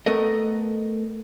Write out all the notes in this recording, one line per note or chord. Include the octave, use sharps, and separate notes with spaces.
A3 B3 A4 A#4 D#5